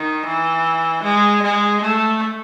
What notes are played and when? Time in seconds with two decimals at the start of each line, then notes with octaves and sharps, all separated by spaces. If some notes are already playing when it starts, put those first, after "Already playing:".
Already playing: D#3
0.26 E3
1.03 G#3
1.42 G#3
1.81 A3